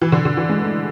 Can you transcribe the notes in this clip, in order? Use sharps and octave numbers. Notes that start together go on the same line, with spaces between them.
E3
D3
D3
E3
G#3
A3